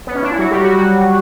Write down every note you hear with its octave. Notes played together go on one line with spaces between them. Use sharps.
B3
C#4
D4
E4
F#3 F#4
G3 G4
F#3 F#4
F#3 F#4